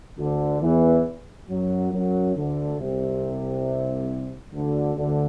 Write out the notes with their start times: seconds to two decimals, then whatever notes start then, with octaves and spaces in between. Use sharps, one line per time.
0.18 D2 D3
0.62 E2 E3
1.50 F#2 F#3
1.93 F#2 F#3
2.36 D2 D3
2.80 C2 C3
4.54 D2 D3
4.97 D2 D3